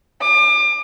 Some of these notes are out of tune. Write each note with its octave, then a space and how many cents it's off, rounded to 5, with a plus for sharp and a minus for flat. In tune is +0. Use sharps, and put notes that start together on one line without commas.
D6 +35